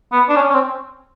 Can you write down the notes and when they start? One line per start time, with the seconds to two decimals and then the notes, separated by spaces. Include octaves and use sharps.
0.12 B3
0.29 D4
0.36 C#4
0.50 C#4
0.53 C4